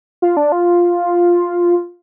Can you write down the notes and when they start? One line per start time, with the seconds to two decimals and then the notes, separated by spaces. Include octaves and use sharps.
0.22 F4
0.37 D4
0.52 F4